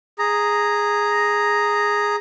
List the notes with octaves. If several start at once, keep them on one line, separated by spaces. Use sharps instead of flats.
G#4 A#5